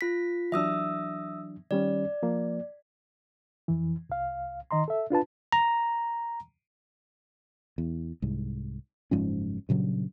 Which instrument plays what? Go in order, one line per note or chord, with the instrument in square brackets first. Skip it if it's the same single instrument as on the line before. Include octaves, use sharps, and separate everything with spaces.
[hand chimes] F4 B6
[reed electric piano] E3 F#3 D4 [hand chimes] E5 D#6 E6
[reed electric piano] D#3 G3 C#4 [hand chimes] D5
[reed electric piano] F3 A#3
F2 E3
C2 F5
D#3 D#5 A#5 C6
A4 E5
D4 F4 B4 A5
[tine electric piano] A#5
[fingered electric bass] E2
C2 G#2
F#1 G#2 F3 C#4
G2 A#2 C#3 F#3